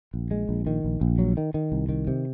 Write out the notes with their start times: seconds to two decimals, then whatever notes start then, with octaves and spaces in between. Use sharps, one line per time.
0.14 A#1
0.31 G#3
0.49 A#1
0.67 D#3
0.84 A#1
1.01 A#1
1.19 F#3
1.37 D#3
1.54 D#3
1.72 C2
1.89 D#3
2.07 C3